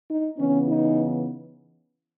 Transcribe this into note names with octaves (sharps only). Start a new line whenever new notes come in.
D#4
C#3 E3 B3 C#4
D#4